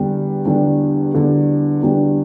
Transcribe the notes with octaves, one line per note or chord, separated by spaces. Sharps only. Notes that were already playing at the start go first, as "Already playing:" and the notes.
Already playing: E2 D3 G3 D4
E2 D3 G3 D4
E2 D3 G3 D4
E2 D3 G3 D4